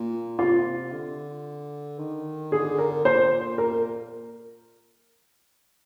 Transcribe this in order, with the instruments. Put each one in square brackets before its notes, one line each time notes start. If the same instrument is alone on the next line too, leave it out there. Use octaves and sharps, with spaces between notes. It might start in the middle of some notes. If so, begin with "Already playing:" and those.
Already playing: [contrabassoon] A#2
[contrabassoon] C3 [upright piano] F4
[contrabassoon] D3
D#3
[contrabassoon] D3 [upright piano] G#4
[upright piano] A#4
[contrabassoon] A#2 [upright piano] C5
[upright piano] A#4